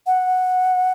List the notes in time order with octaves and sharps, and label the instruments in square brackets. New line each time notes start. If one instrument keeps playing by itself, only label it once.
[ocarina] F#5